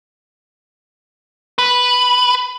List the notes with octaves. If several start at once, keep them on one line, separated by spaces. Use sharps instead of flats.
B4